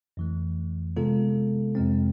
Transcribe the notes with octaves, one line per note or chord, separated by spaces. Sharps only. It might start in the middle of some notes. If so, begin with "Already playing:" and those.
F2 E3 A3
C3 G#3 B3 F4 A4
F2 C3 G#3 C4